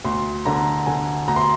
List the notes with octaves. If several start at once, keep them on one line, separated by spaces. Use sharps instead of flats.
D2 C6
D3 A#5
D3 G#5
D2 A#5
C6